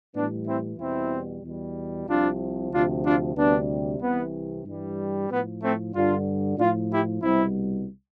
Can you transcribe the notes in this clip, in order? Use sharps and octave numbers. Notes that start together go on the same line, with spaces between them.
A2 E3 G3 B3 D4
C4 E4
E2 B2 G3 C4 E4
E2 B2 G3
C2 C3 F3 D4 F4
D2 C3 F3 D4 F4
D4 F4
D2 C3 G3 B3 D4
C2 C3 E3 B3
G2 E3 G3
A2 F3 B3
A3 C4
G2 D3 G3 D4 F4
A2 D4 F4
F3
E4 G4
C2 B2 G3 C4 E4